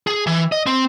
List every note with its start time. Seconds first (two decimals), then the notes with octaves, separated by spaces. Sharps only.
0.07 G#4
0.27 E3
0.52 D#5
0.67 C4